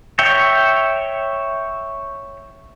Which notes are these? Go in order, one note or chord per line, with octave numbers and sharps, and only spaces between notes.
C#5 E5 G5